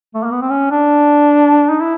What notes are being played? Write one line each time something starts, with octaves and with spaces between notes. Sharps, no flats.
A3
A#3
B3
C4
C#4
D4
D#4
E4